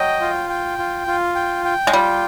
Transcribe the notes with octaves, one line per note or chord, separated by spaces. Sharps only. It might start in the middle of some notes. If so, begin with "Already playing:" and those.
Already playing: F#3 D#5 G5
F4
G5
F4
F4
G5
G5
G#3
G3 F4